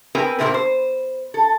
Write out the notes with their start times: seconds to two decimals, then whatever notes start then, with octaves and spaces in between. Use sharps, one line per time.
0.15 C4 A#4 B4 G#5
0.39 A#2 A3 A#3 C4 E4 A#4
0.54 C5
1.34 A4